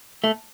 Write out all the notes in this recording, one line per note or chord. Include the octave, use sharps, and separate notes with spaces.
A3